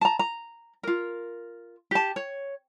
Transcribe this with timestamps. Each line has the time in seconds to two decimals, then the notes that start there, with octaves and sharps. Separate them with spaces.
0.01 A5 A#5
0.19 A#5
0.83 F4 A#4
1.91 G4 A5
2.16 C#5